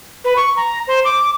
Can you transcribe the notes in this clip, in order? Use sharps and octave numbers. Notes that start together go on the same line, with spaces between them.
B4
C#6
A#5
C5
D6